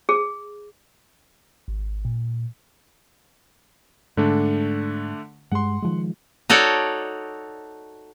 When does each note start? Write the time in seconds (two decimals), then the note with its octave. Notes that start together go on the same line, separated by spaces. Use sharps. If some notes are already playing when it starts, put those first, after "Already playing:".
0.09 G#4
1.68 G#1
2.05 A#2
4.17 G#2 D3 A3 D4
5.52 G2 G3 G#3 F#5 C6
5.82 D#3 F3 G#3
6.50 D#4 F#4 A4 C#5 D5